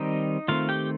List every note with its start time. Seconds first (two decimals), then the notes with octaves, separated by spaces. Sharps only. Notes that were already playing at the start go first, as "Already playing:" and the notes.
Already playing: D#3 G3 C4 D#4 D#5
0.48 D#3 A3 C4 F4 F5
0.69 G4 G5